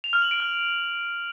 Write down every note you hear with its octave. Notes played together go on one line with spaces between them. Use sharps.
F7
F6
F#7
D7
F6